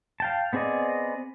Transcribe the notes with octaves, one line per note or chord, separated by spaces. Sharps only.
F5 G5 A5
B3 C4 G#4 D5 D#5